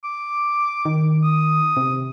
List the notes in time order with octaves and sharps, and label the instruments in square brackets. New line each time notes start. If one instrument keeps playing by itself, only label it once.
[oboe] D6
[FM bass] D#3
[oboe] D#6
[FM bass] C3